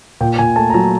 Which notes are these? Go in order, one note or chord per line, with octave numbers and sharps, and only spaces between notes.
A#2 G5
A#2 G#5
A3 A5
A#5
F#3 A5